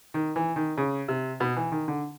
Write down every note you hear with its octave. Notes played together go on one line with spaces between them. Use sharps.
D#3
E3
D#3
C#3
C3
B2
E3
D#3
D3